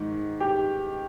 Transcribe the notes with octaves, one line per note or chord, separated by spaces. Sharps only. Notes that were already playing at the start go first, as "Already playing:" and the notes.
Already playing: G#2 D#3
G4